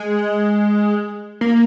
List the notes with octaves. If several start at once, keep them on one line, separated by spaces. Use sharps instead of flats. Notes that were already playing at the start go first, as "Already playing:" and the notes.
Already playing: G#3
A#3